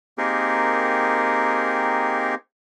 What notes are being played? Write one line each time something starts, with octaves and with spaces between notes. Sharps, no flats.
A#3 C4 D#4 G4 G#4 A#4